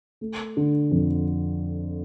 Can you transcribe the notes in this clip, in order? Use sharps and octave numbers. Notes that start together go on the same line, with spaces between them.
A3
D3
F2